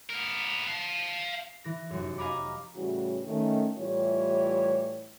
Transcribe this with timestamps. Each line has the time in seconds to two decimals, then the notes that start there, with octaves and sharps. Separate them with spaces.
0.10 B3 A#4
0.68 F5 A5
1.64 E3 A#6
1.90 F1 F#2
2.18 D#5 F5 G#5 A#5 B5 D6
2.75 A2 C#3 E3 G3 F#4
3.27 D#3 A3 C#4
3.78 A2 E3 G3 F4 G4 C#5